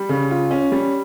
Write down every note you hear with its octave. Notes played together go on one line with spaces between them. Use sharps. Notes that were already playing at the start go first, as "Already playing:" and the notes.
Already playing: G3
C#3
F4
C#4
G3